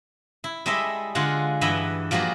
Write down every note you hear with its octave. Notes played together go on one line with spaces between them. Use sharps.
E4
G3 G#3 E4 A4 D#5 E5
D3 G#3 F4 F#5
G2 E3 D#5 E5 F#5 B5
F3 G3 A#3 F#4 G#4